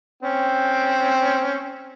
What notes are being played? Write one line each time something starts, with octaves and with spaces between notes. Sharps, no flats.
C4 C#4 G5